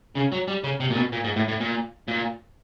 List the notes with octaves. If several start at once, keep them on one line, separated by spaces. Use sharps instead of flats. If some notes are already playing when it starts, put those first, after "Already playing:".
C#3
F#3
G3
C#3
C3
A#2
B2
A#2
G#2
A2
A2
A#2
A#2